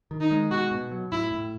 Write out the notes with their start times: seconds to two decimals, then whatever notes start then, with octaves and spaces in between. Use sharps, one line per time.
0.11 D#3
0.21 D#4
0.31 G#3
0.51 B2 F#4
0.71 B2
0.91 F#3
1.12 A2 E4
1.32 A2